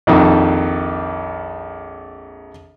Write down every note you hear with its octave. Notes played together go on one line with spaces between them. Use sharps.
A#1 F2 D#3